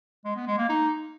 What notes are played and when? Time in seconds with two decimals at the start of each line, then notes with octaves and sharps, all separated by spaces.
0.25 G#3
0.36 B3
0.47 G#3
0.58 A#3
0.69 D#4